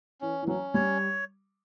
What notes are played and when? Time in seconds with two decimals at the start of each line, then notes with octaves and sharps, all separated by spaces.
0.21 E3 C#4
0.42 E3
0.47 F#3 C#4
0.74 G3 C#5